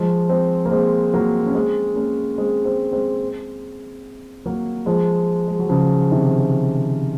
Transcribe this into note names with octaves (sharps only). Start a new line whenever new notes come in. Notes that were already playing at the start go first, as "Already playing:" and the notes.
Already playing: F3 G#3
G#3 C4
A#3
G#3 C4
F#3 A#3
C#4
G#3 C4
A#3 C#4
G#3 C4
G#3 C4
G#3 C4
F#3 A#3
F3 G#3
G#3
F#3
C#3 F3
C3 D#3